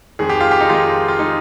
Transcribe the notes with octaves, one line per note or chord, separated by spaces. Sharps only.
F2 D#3 G#3 G#4
G4
F4
G4
D#4
F2 D#3 G#3 F4
F4
D#3 G#3 D#4